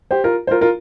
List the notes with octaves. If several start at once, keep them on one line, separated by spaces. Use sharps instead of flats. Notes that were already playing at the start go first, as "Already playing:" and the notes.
G4 C5
F4 A#4
C5
F4 A#4
F4 A#4